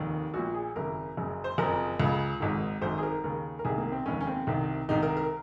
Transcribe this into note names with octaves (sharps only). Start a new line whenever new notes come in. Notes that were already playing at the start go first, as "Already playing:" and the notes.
Already playing: F1 D#2 D#3
A#1 F#4
A#2
G#4
G#1 F#2 C#3 A#4
F#1 F#2 C#3
C5
F#1 F2 C#3 A#4
C#2 C#3
G#1 G#2 D#3
G#1 F#2 D#3 C5
G#4
A#4
D#2 C#3 A#4
A#4
C2 C3 D#3 G#4
A#3
C4
F1 D#2 D#3 C#4
C#4
C4
C2 C3 D#3
C2 C3 D#3 D#4
A#4
A#4